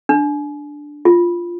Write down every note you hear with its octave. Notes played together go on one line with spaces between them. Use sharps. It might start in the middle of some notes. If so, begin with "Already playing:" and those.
D4
F4